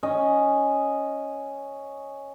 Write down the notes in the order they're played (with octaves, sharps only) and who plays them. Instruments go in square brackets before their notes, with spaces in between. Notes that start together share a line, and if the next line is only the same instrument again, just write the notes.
[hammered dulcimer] C#4 D#5